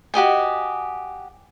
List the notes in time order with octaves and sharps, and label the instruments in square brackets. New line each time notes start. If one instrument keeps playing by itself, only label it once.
[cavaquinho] F#4 G4 D#5 G#5